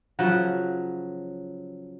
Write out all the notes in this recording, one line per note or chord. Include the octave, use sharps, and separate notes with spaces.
C#3 F3 F#3 F#5